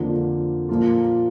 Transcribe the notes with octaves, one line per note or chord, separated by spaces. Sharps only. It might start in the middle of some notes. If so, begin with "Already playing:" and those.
Already playing: F2 D3 F3 A#3
A#2 F3 A#3 F4